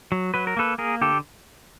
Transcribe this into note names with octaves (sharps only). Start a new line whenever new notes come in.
F#3
F#3 B4
A#4
A#3 A4 B4
A#3 G#4 A#4
D3 G4 A4